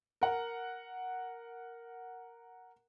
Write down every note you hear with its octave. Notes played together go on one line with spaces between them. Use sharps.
A#4 F#5